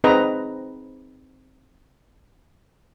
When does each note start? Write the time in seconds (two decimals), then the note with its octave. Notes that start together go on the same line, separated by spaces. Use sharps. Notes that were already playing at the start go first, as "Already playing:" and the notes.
0.04 C4 D#4 G#4 B4 D#5 A#5